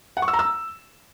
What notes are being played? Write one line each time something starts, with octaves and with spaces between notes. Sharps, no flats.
F#5
C#6
E6
A#5
E6